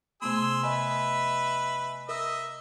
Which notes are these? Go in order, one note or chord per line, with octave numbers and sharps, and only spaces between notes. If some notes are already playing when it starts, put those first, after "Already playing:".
C3 A3 B3 G#4 C6 E6
B4 D#5 E5 G#5
A#4 D#5 E5 E6